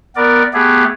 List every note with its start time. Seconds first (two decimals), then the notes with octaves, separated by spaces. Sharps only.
0.16 B3 A#4 D5
0.54 A3 B3 G4 G#4